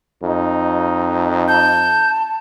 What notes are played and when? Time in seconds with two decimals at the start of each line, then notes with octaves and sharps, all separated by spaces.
0.23 F2 D#4
1.48 A5 G6